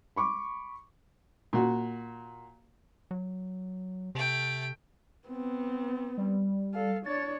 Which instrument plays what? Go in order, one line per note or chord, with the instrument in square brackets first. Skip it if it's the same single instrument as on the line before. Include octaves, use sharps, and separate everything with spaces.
[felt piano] B5 C#6 D6
[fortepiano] A#2 F#4
[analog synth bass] F#3
[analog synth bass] C3 [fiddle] A3 G5
[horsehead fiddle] B3 C4
[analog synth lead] G3
[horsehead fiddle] A4 F5
[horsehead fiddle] D4 C#5 [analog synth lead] A6